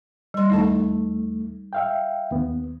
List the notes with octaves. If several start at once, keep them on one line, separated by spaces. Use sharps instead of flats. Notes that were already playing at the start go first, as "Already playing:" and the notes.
G3 C6
D#2 A3 D#4 E4 A5
E5 F5 G5
D#2 B3